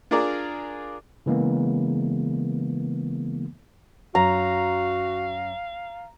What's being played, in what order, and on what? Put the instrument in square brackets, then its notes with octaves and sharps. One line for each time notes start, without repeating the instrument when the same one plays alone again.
[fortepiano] D4 F4 G#4 A#4 D5
[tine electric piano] C#3 E3 G#3 A#3 B3
[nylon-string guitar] F#2 [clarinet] F#4 [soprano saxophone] F5 [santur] A#5